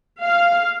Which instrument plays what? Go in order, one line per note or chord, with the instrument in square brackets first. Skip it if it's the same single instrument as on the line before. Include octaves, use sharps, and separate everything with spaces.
[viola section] F5